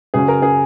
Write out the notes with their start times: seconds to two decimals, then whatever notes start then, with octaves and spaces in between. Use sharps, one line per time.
0.14 F#2 C#3 F#3 C#4 G#4
0.28 A#4
0.42 G#4